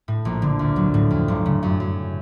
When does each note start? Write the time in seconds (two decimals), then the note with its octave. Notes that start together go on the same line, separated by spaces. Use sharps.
0.08 A2
0.25 A#1
0.42 D3
0.59 D2
0.76 F#3
0.94 A2
1.11 F2
1.28 G1
1.46 C#3
1.63 F#2
1.80 F#2